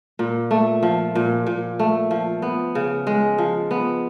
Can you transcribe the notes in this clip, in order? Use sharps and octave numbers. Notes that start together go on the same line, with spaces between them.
A#2
A3
F3
A#2
A#2
A3
F3
B3
C#3
G#3
F3
B3